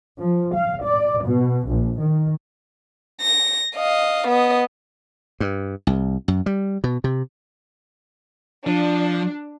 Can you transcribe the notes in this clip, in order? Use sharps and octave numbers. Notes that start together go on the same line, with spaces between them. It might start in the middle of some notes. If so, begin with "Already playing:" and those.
F3
F5
D5
B2
A#1
D#3
A#6
D#5 F5
B3 D#5
G2
C2
F#2
G3
B2
C3
F3 D4